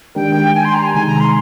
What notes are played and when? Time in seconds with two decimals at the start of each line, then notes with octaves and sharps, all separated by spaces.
0.15 D#3 G#3 D4 G4 A#4 G5
0.55 G#5
0.65 C6
0.75 A#5
0.84 G#5
0.94 C3 D#3 G#3 D#4 G#5
1.07 A#5
1.20 C6